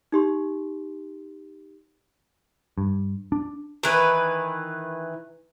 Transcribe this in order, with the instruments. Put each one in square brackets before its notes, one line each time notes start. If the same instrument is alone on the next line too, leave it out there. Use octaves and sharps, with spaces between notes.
[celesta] D#4 G4 C6
[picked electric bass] G2
D4
[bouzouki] D#3 E3 B4